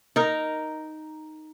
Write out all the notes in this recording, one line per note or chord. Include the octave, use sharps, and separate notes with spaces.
D#4 A#4